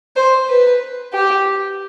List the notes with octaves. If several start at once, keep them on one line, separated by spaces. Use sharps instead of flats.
C5
B4
G4